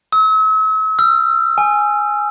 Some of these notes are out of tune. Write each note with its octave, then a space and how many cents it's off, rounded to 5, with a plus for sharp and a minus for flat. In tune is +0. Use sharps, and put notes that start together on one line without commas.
E6 -40
E6 +45
G#5 +0